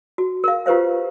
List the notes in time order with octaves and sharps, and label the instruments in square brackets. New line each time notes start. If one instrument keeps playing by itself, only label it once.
[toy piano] F#4
A#4 F5
F4 G4 B4 C5 F5